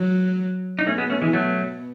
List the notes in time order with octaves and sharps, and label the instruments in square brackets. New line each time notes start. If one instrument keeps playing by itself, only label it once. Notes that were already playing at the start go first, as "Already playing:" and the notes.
Already playing: [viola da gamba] F#3
[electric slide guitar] D#4
[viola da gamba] B2 [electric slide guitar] A3 C#4
[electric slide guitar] G#3 B3
A3 C#4
E3 G#3
F#3 A3